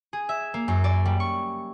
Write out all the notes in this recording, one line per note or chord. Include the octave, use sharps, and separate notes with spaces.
G#4
E5
A#3
F#2
D5
G3
C#6